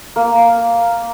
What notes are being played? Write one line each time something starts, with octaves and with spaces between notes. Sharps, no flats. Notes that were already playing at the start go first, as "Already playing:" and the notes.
A#3